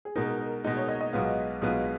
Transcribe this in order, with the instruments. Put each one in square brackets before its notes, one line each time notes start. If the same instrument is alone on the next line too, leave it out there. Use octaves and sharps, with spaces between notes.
[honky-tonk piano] G#4
[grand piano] B2 G#3 D#4 [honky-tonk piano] A#4
[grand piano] B2 G#3 D#4 [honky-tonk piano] D#5
[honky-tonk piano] C#5
D#5
D#5
[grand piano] B1 B2 G#3 B3 F4
B1 B2 G#3 B3 F4